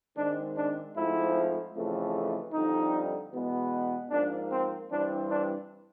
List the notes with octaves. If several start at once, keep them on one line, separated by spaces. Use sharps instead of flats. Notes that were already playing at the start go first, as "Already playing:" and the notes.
G#2 D#3 G#3 C4 D4
D4
G#2 F3 A3 C4 E4
F2 C#3 E3 A3
F2 D3 G3 D#4
E2 B2 G#3 B3
G#2 F3 A#3 D4
C4
G2 E3 G3 C4 D4
D4